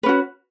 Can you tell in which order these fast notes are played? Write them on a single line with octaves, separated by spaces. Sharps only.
B4 C#4 F#4